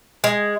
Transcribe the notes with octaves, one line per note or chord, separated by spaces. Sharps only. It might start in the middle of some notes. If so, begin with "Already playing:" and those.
G#3